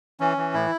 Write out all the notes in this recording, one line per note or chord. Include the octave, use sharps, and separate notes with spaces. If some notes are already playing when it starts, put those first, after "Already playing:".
E3 C#4
E3
A2 E4